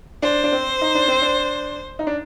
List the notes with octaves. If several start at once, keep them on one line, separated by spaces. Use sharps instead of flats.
D4 C5
D4
C4
D#4
D4
C4
D4
D#4
D4